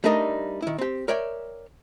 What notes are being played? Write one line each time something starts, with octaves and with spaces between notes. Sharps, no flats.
G3 A3 D4 D#4 A#4 D#5
D#3 E4
C4 G4
A#4 C#5 D5 E5 G5